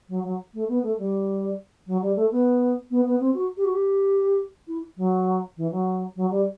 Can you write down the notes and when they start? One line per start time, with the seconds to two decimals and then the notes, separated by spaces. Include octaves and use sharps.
0.09 F#3
0.24 F#3
0.54 A3
0.69 B3
0.83 A3
0.98 G3
1.87 F#3
2.02 G3
2.16 A3
2.31 B3
2.91 B3
3.05 B3
3.20 C4
3.34 F#4
3.57 G4
3.65 F#4
3.73 G4
4.68 E4
4.97 F#3
5.57 E3
5.71 F#3
6.16 F#3
6.30 G3